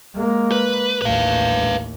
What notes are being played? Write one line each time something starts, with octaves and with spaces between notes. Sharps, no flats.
G#3 A#3
B4
A1 D#2 B4 F5